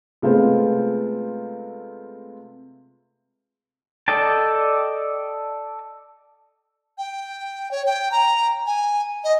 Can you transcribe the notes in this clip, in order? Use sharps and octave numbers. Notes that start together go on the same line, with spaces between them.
C3 G#3 A3 B3 F4 C5
A4 D5 D#5 G5 A5
G5
C#5
G5
A#5
G#5
D#5